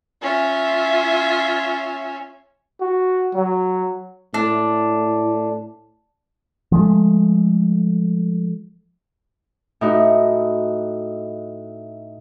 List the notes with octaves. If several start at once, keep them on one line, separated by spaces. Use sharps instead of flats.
C#4 F4 E5
F#4
F#3
A2 D4
F3 G#3 A3
A2 D#4 F#4